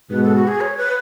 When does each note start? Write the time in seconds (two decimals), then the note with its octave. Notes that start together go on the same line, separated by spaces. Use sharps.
0.10 G#2 B2 B4
0.23 A4
0.36 F#4
0.48 G#4
0.61 C#5
0.78 B4